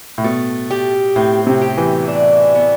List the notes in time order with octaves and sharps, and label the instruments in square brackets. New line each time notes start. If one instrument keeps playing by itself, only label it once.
[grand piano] A2
[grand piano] B2 [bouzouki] A3
[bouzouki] G4
[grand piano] A2 [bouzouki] C4
[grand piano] C3
[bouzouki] G4
[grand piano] E3
[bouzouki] D4
B3